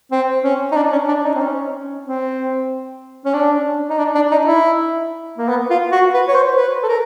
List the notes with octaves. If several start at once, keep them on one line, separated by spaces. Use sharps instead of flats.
C4
C#4
D#4
D4
C#4
D4
D#4
C4
C#4
C4
C#4
D4
D#4
D4
D4
D#4
E4
A#3
B3
F4
F#4
B4
C#5
C5
B4
A4
A#4